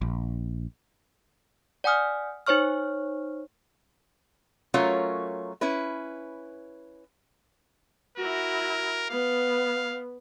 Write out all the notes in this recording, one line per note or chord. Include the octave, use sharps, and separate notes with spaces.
A#1
D5 F#5 G#5 D#6 F6
D#4 C5 C#5 C#6 F6
F#3 A3 C#4 F4 A#4 C#5
C#4 E4 B4
E4 F#4 A#4
B3 F5